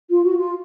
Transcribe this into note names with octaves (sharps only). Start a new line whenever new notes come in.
F4
F#4
F4